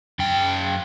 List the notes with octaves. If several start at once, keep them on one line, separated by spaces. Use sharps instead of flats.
F#2 G5